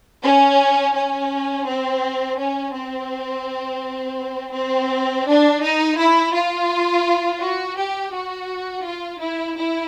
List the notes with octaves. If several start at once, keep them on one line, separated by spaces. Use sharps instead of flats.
C#4
C#4
C4
C#4
C4
C4
D4
D#4
E4
F4
F#4
G4
F#4
F4
E4
E4